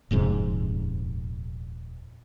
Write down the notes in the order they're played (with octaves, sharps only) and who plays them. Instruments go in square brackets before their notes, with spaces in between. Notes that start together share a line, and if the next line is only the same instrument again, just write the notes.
[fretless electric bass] D#1 F2 G#2 C3